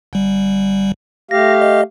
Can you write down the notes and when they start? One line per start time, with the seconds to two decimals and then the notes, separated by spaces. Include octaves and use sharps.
0.13 G1 G3
1.31 A3 G4 F5 A#6
1.61 D#5